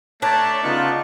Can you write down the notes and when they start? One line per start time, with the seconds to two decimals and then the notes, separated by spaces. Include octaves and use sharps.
0.22 A3 D4 C#5 A5 A#5
0.63 C#3 B3 D#4 F4 C#6 F#6